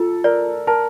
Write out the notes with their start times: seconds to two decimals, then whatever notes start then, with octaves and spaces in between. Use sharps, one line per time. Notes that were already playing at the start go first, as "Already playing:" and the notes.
Already playing: F4 A4
0.24 A#4 D5
0.67 A#4 A5